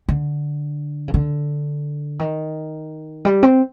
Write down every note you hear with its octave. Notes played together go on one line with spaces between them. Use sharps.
D3
C#3
D3
D#3
G3
C4